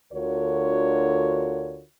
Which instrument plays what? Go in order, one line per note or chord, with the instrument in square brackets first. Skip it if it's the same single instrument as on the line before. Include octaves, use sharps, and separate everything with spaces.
[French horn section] D2 D3 F4 F#4 A#4 C#5